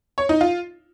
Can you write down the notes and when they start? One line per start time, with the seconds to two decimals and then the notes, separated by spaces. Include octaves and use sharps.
0.18 C#5
0.29 D#4
0.41 F4